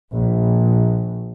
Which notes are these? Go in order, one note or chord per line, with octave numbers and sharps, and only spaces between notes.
A#1